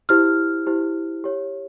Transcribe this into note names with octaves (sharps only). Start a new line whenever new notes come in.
E4 G4 C5 F6
E4 G4 C5
G4 C#5